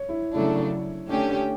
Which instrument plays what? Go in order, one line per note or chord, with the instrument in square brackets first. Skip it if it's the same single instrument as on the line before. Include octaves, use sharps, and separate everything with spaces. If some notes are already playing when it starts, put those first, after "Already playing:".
Already playing: [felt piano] C#5
E4
[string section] C#3 F#3 A3 D4 [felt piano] E4
[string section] D3 A3 C#4 G4 [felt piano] D4